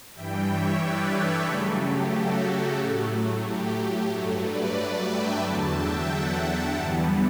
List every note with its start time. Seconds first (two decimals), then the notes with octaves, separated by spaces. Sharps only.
0.14 G2 E3 G3 E5 G5
0.47 C#5 E5
0.80 B4 D5
1.13 A4 C#5
1.46 C#3 F#3 A3 G4
1.79 G4
2.12 F#4 A4
2.45 G4
2.78 A2 F#3 A3
3.44 G4
4.10 G2 F#3 A3 A4 C#5
4.43 B4 D5
5.09 E5 G5
5.42 E2 D3 F#3 F#5 A5
5.75 E5 G5
6.08 F#5 A5
6.74 G2 E3 G3 B3 F#5 A5